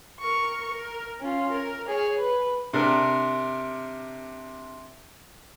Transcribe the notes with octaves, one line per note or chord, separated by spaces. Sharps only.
A#4 C#6
A#4
C#4 F4
A#4
G#4 C#5
B4
C3 D4 A#4